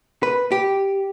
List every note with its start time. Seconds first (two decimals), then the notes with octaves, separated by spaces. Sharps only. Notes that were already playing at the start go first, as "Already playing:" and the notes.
0.23 B4
0.52 G4